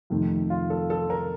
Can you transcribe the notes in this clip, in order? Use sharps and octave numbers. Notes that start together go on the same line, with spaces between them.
F2 C3 D#3 A3
F4
A4
A4
A#4